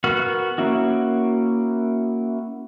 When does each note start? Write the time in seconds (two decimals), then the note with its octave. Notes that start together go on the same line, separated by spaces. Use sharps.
0.04 B3 F#4 A#4 F#5 F6
0.58 A#3 C#4 E4 F#4